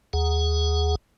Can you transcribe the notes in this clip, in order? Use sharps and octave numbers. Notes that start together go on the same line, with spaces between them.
D#2 G#4 F#5